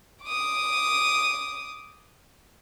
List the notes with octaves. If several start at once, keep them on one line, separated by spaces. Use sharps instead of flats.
D6 D#6